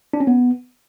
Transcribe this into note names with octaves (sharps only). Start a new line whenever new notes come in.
D4
C#4
B3